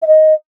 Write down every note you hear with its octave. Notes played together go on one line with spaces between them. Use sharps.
E5
D#5